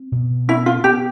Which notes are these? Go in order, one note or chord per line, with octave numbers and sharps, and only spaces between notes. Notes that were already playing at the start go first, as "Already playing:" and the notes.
Already playing: C4
B2
B3 E4
F4
B3 G4